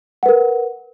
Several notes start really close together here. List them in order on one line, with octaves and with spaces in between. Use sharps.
F#5 B4 A#4